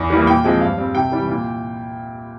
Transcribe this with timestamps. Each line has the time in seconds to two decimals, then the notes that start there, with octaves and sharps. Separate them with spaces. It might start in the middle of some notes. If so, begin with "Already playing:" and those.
Already playing: E2
0.10 E3 G3 A#3
0.27 A#2 G5
0.44 F3 G#3 C4
0.61 G2 F5
0.78 G3 C4
0.95 C3 G5
1.12 E3 G3
1.28 A#2